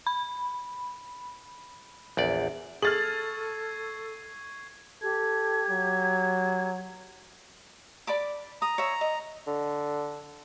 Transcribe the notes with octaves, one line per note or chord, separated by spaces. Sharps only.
B5
A#1 E2 D5
G#4 A4 C#6 F6 G#6 A6 C7 F#7
G4 A4 G#6
F#3
D5 B5 D6
A#5 D#6
C#5 E5
D#5
D3